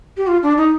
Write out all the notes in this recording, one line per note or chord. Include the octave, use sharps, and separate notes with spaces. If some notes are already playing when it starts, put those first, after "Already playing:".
G4
F4
D4
D#4